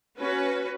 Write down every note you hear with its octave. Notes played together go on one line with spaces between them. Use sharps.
C#4 F#4 B4